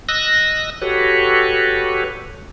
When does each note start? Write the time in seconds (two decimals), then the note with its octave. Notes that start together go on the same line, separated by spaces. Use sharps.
0.09 D#5 E6 F#6 A#6
0.82 F#4 G4 A4 B4 C#5